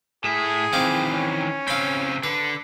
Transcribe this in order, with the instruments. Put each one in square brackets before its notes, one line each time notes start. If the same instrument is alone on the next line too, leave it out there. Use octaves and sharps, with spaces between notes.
[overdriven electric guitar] A2 E5 [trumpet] G#4
[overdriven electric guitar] D#3 E3 [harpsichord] C4 F5 D6
[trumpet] C#4
[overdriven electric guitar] C#3 C4 [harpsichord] F5 B5
[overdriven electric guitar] D3 [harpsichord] B4